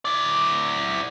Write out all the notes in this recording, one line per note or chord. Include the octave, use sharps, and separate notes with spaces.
E4 D5